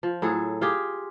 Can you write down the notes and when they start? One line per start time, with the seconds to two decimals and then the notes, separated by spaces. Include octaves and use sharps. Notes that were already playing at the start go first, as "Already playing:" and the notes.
0.03 F3
0.22 A2 F#3 G#4 A4
0.61 F4 G4 G#4